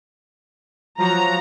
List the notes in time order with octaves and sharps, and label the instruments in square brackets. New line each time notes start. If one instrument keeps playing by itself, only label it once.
[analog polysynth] F3 F#3 F#4 [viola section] A#5